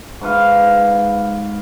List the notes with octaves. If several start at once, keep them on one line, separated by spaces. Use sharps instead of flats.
G#2 B4 F5